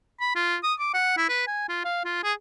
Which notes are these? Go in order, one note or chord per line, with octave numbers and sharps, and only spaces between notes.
B5
F4
D#6
D6
F#5
E4
B4
G#5
F4
F5
F4
G#4